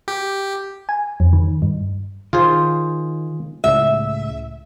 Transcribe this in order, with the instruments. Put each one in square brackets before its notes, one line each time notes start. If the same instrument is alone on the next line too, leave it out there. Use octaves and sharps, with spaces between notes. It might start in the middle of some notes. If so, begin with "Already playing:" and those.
[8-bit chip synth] G4
[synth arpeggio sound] G#5
F2
D#3
G2
[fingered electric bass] D#3 [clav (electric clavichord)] F4 G#4 C5
[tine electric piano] C#2 A2 C#3 [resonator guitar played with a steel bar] E5